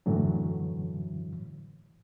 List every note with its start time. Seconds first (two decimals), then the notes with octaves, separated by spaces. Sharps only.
0.06 F#2 A2 D3 E3 F#3